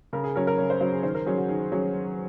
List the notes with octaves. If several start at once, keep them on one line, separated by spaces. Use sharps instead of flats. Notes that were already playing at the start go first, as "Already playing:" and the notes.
C#3 A#4
G#4
F#3 C#4 A#4
A#4
C#3 C#5
C5
F#3 C#4 C5
G#4
D#3 C5
A#4
F#3 C#4 G#4
F#4
D#3 G#4
F#3 C#4 G#4